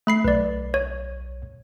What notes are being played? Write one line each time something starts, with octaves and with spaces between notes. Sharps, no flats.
A3 B5 C7
B1 B4 D5
C#5